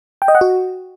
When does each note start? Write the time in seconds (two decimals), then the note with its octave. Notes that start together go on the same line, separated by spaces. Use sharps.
0.22 G5
0.28 D#5
0.35 F#5
0.41 F#4